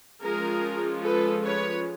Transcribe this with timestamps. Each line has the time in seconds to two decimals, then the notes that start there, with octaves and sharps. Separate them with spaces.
0.22 F3 G#3 C#4 F4 G#4 A#4
1.04 A4 B4
1.44 B4 C#5